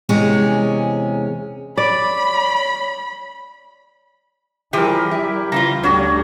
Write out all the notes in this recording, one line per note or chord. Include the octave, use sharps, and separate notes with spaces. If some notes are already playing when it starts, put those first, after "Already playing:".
E2 C3 G#3 C#4 G#4
C#5 D5 B5
E3 F3 G3 G4 G#4 A#4
E4
C#3 E3 F4 A#5
D2 G3 D4 F#4 C#5